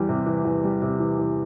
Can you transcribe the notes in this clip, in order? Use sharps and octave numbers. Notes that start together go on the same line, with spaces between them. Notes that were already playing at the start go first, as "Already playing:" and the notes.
Already playing: E2 E3 G3
C3
E3
E2
G3
C3
E3
E2